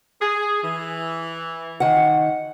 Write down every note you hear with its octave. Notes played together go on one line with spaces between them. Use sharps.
G#4
E3
D#3 F#5